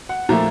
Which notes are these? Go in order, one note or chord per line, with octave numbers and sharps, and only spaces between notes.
F#5
A#2 F3 A3 A#5